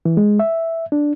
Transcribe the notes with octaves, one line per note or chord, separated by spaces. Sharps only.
E3
G#3
E5
D4